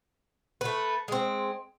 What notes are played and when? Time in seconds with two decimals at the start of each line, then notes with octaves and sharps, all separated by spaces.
0.61 A3 B4
1.08 G#3 C4